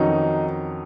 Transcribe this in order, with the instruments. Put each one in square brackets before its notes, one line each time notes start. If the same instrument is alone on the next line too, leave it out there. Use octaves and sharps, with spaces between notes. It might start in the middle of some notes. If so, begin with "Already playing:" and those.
Already playing: [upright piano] F2 D#3 F#3 C#4 F#4 [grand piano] D#4